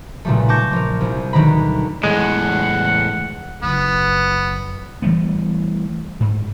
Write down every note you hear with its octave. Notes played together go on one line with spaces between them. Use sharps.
B1 A#2 C#3 G3 A3
A5 C#6 D6 G6 A#6
A#1 A#4
C2
D2 B2 D#3 F#3 A#5 B5
E2 A2 G#3 F#5
F#1 F#2 B3
E3 G3 A3 B3
G#2